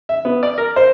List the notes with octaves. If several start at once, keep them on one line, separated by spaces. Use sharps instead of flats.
E5
B3
D5
A#4
C5